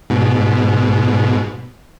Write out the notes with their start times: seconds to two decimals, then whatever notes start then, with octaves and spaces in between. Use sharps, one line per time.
0.10 G#2 B2